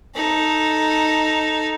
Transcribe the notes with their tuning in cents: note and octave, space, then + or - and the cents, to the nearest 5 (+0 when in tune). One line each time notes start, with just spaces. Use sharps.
D#4 +0 A4 +0